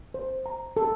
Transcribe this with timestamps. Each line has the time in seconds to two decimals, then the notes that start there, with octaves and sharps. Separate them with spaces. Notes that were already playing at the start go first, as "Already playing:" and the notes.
0.14 C5
0.46 A#5
0.77 A4